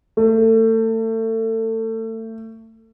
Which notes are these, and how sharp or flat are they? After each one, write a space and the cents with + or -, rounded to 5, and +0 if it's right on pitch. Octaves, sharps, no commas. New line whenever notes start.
A3 +30